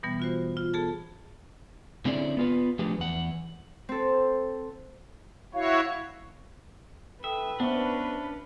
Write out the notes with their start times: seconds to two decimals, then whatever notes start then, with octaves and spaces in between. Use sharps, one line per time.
0.03 B2 E3 G3 B3
0.20 F4 F#4 C5
0.57 F4
0.73 B3 G#4 A4 A5
2.05 D3 C4 C#4 E4 G#4 D5
2.37 B3 F4 B4
2.79 F3 A3 D4 G4 G#4 B4
2.98 E2 F#5
3.89 C4 A4
5.54 E4 F#4 C#5 F5
7.24 A4 B4 E5 G5 D#6
7.60 B3 C#4 D4 C5 E5 C#6